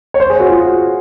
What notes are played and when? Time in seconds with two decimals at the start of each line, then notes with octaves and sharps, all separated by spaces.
0.14 C#5
0.20 C5
0.30 G#4
0.40 F#4
0.48 F4